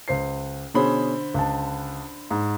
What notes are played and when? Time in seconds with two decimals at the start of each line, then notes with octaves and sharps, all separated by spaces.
0.08 C#2 C5 C7
0.74 B2 D3 C#4 G#4 C5 B5
1.34 C#2 A5
2.31 G#2